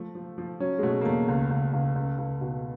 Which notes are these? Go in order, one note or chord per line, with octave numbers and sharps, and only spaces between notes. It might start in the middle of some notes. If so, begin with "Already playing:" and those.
Already playing: F3 A3
F3
F3
F#3 C#4
G#3
B2 A3
A#3
E2 A3
C#2
C#2
C#2
C#2
C#2
B2